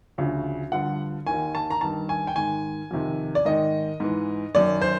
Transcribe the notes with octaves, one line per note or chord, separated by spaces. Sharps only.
D2 C#3 F3
G2 D3 F3 F#5
D#2 D#3 G#5
A5
A#5
G2 D#3 A5
G#5
G5
G#2 D#3 G#5
F2 C3 D#3
D5
G#2 D#3 D#5
G#2 E3
F#2 D#3 D5
C5